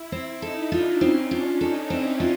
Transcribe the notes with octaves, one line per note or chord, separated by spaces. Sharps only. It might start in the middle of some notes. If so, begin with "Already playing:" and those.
Already playing: E4
C4 E4
D#4 A4
D4 F4
C4 C#4
D4 F4
D#4 A4
C4 E4
F4